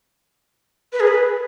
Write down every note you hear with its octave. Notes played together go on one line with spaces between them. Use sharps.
B4
G#4
B4